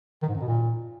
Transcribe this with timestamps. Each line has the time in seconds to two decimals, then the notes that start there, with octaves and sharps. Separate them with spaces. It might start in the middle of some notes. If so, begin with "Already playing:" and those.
0.22 D#3
0.29 G#2
0.35 F#2
0.41 B2
0.48 A#2